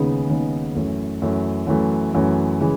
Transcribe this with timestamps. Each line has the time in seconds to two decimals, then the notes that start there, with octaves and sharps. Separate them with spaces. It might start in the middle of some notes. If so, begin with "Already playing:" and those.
Already playing: D#2 C#3 G#3 B3 D#4
0.29 D#2 C#3 G#3 B3 D#4
0.75 F#2 E3 A3
1.22 F#2 E3 A3
1.67 F#2 E3 A3
2.13 F#2 E3 A3
2.60 C#3 E3 G#3